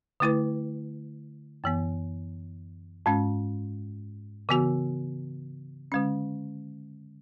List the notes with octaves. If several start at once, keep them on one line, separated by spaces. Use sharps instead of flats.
D3 A3 E4 B4
F#2 E3 B3
G#2 G#3 C#4
C#3 E3 B3 F#4
D3 G#3 C#4